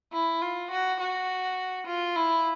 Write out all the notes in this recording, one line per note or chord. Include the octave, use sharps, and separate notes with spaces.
E4
F4
F#4
F#4
F4
E4